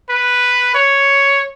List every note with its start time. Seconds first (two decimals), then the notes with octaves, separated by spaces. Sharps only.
0.10 B4
0.75 C#5